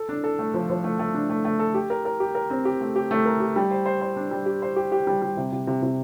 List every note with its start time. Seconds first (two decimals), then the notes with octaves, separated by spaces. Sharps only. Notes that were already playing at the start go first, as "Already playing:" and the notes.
Already playing: A4
0.09 D4
0.24 A4
0.39 A3
0.54 F3
0.70 F3
0.84 A3
0.99 A3
1.14 D4
1.30 A3
1.45 A3
1.59 A4
1.74 G4
1.90 A#4
2.05 A#4
2.20 G4
2.35 A#4
2.50 C4
2.65 G4
2.81 A3
2.96 G4
3.11 A3
3.26 A#4
3.40 G4
3.56 G3
3.71 C5
3.86 C5
4.01 C5
4.16 D4
4.31 G3
4.46 G4
4.62 C5
4.76 G4
4.92 G4
5.07 G3
5.22 G3
5.37 C3
5.52 C3
5.67 C3
5.82 C3